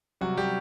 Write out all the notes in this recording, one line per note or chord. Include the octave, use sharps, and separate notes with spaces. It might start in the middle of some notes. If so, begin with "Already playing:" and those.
C3 F#3 G3 F#4
G3 G4